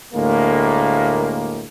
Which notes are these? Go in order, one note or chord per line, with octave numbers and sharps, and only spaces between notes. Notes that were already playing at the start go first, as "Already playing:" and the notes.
D2 A2 G#3 A#3